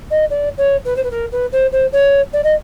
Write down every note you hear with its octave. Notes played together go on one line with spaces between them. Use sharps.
D#5
D5
C#5
B4
C5
B4
A#4
B4
C5
C5
C#5
D5
D#5